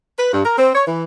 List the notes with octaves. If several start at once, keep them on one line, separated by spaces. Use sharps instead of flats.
B4
G2
A#4
C4
C#5
E3